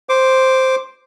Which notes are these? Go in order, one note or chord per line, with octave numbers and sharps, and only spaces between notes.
C5 D6